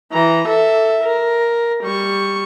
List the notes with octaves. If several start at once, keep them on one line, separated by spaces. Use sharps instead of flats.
E3 A#5
A4 E5
A#4
G3 C#6